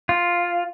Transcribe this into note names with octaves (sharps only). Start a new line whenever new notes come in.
F4